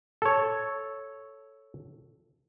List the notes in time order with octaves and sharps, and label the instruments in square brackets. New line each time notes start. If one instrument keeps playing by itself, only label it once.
[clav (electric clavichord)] A4 C#5